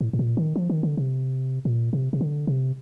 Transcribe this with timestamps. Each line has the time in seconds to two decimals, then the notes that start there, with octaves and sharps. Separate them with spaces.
0.01 A2
0.13 A2
0.19 A#2
0.37 D#3
0.56 F3
0.70 D#3
0.83 D3
0.97 C3
1.65 A#2
1.93 C3
2.13 C3
2.21 D3
2.47 C3